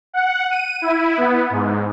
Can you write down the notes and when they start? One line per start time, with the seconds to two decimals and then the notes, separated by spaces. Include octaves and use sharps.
0.13 F#5
0.51 D#7
0.82 E4
1.17 B3
1.50 G#2